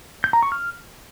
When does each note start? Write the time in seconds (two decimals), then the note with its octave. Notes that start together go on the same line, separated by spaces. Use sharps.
0.24 G6
0.33 A#5
0.43 C#6
0.52 F6